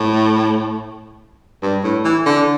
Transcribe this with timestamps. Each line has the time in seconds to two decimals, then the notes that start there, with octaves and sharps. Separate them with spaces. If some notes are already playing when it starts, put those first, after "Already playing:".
Already playing: A2
1.62 G2
1.83 A2
2.04 E3
2.26 D3